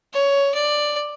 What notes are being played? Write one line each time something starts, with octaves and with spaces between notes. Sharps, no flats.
C#5
D5